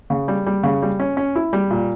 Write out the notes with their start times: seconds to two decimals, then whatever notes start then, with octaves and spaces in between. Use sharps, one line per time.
0.10 C#3
0.28 G3
0.46 G3
0.63 C#3
0.82 G3
1.00 C#4
1.17 C#4
1.35 E4
1.53 G3
1.71 A#2